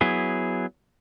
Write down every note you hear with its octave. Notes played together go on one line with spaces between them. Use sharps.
F#3 B3 E4 G#4